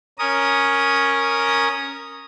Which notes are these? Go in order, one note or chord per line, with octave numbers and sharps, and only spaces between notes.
C#4 A#4 D#6